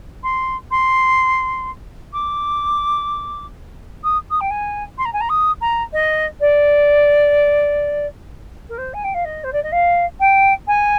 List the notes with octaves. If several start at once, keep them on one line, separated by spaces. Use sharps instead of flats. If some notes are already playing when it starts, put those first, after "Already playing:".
C6
C6
D6
D#6
D#6
G5
G#5
C6
A#5
G#5
A#5
D#6
A#5
D#5
D5
A#4
C5
G#5
G5
F5
D#5
C5
D5
D#5
F5
G5
G#5